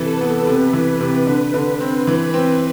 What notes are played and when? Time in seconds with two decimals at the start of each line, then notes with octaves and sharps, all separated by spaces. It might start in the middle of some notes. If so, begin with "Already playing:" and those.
Already playing: C3 E3 A4 B4
0.21 B3
0.47 C3
0.73 E3
1.01 C3
1.27 D3 B4
1.54 D3
1.81 C4
2.07 E3
2.34 C4